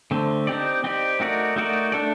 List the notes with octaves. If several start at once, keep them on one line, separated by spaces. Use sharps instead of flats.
D3 A3 C4
C4 D#4 G4 D5
C4 D#4 G4 D5
A3 D#4 F#4 A#4 D5
A3 D#4 F#4 A#4 D5
A3 D4 A4 D5